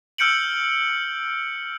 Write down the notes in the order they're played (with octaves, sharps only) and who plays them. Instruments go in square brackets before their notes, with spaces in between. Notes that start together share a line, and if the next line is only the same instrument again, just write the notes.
[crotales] E6 F6 G6 C#7 D7 F#7